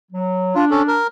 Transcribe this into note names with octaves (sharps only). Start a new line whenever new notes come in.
F#3
D4 F4
C#4 A4
A#4